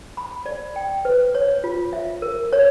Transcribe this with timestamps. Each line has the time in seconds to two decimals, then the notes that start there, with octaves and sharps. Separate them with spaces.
0.17 B5
0.46 D5
0.76 G5
1.05 B4
1.35 C#5
1.64 F4
1.93 E5
2.22 A#4
2.53 C#5